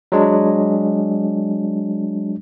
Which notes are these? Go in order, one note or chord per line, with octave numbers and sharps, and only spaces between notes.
F#3 G#3 D4